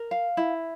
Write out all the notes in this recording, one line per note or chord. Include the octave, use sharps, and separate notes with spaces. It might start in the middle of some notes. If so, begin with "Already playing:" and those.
Already playing: A#4
F5
E4